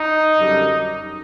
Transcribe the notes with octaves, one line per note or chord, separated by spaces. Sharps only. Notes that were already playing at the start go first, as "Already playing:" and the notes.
Already playing: D#4
F#2 D3 G3